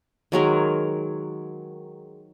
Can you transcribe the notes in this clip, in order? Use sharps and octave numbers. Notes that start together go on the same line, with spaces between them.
D#3 F#3 G#3 A#4